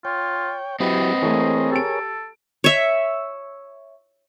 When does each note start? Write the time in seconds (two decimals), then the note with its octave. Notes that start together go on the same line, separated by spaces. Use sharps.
0.05 F4 C#5 G5
0.80 F#3 C4 E4 G4 B4 D#5
1.22 E3 A3 G#4 A#4 C#5
1.72 G4 A4 D7
2.64 C#5 E5